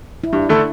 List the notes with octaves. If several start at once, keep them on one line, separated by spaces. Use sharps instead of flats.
E4
G2 D4
D3 A3 E4 A4